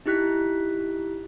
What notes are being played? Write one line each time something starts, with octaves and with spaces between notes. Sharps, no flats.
D#4 E4 G4 F#6 B6